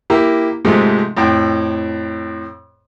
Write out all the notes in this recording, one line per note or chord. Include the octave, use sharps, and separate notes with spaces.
A#3 E4 G4 A#5
G#2 C3 F3 G#3 A3
F2 A2 G5